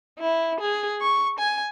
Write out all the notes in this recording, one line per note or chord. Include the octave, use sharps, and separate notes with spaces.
E4
G#4
C#6
G#5